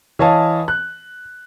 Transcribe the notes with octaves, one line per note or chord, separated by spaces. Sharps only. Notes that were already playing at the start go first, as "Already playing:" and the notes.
E3 C#5 D#5 F5 A5
F#6